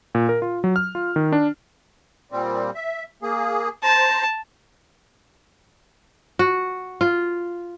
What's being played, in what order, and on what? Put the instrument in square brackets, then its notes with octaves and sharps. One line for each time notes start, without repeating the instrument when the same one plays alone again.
[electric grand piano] A#2
A#4
F4
F#3
F6
F4
D#3
D4
[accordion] A#2 G3 C4
E5
A#3 G#4
[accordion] C5 A#5 [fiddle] A5
[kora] F#4
F4